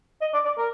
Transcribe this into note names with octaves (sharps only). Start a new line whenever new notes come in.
D#5
D5
D5
A#4